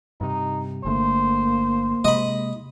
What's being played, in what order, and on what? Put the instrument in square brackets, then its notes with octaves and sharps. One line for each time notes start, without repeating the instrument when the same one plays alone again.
[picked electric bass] G2 C3 [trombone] D#4
[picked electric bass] G1 D3 A3 [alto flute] A#3 [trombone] C5
[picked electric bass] C3 G#3 [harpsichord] D#5 B5